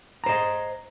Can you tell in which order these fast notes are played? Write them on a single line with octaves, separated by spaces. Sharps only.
A#5 C5 D#5